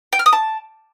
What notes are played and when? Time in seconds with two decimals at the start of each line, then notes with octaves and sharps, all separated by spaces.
0.13 G5
0.19 F6
0.26 D#6
0.33 A5